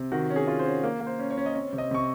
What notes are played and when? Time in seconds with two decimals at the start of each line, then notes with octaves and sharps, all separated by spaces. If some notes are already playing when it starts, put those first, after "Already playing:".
Already playing: C3
0.12 D#3 F#4
0.30 C#4
0.36 G#4
0.47 F4
0.59 C5
0.65 C#4
0.84 A#3
1.01 A#3
1.07 C5
1.19 C#4
1.31 C#5
1.37 C#4
1.46 D#5
1.55 C4 C#5
1.73 C3
1.78 D#5
1.91 C3 C#6